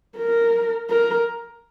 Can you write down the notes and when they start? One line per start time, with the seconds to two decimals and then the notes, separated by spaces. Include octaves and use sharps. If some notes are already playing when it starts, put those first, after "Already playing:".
0.17 A#4
0.89 A#4